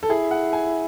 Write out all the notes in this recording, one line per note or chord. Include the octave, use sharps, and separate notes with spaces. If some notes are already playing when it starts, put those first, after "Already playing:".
A4
E4 G#4
F#5
G#5